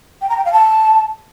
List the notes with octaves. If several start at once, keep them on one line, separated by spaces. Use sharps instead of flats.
G5
A#5
G5
F5
A5